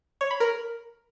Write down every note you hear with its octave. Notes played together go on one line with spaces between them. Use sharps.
C#5
B5
A#4